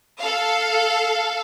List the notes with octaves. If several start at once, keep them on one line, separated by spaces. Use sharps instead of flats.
A4 F5